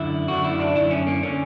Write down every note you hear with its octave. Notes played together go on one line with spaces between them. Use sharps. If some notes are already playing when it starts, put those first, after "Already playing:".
Already playing: F#2 D3 E4
F#2 D3 F#4
E4
D4
F#2 D3 E4
C#4
A#3
D3 C#4